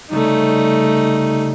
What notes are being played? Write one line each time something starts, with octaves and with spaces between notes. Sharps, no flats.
C2 C#3 G3 A3 D#4